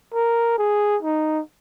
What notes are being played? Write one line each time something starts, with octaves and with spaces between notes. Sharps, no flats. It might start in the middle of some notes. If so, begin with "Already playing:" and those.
A#4
G#4
D#4